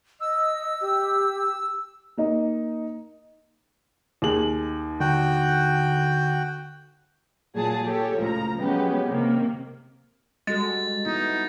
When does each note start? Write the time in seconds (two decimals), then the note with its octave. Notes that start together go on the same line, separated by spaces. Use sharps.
0.21 D#5 E6
0.81 G4
2.17 A#3 D#4 D#5
4.22 D#2 G#4 F#7
5.00 D3 F#4 G5
7.55 A#2 F#3 G#4 A5
7.86 G4 A4 C#5
8.15 C#2 A2 F3 A#5
8.57 F3 F#3 G#3 B3 C#4 G4
9.07 C3 D#3 A#3
10.47 G3 G#3 F#4 A4 A6
11.06 B3 D#4 E4